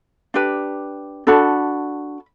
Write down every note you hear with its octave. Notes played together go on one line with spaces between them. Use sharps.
D4 G4 B4
D4 F#4 A4 B5